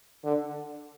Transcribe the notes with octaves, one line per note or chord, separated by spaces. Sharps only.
D3